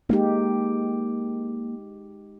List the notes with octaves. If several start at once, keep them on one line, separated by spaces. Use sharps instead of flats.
G#3 A#3 D#4 G4